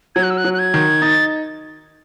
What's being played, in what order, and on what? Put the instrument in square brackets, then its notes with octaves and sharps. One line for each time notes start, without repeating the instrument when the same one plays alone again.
[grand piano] F#3 [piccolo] G#6
[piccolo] F#6
E6
F#6
[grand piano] F#3
[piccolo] F#6
G#6
[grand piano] D#3
[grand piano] D#4 [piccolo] A6